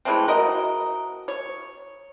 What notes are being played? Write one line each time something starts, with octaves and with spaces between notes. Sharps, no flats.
E3 G#3 A3 C4
F#4 A#4 D#5
C#5